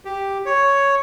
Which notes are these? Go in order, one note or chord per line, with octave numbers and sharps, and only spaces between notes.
G4
C#5